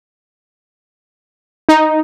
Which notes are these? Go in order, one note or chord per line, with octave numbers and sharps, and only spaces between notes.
D#4